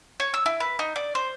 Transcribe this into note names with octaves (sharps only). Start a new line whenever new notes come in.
C#5
E6
E4
B4
D#4
D5
C5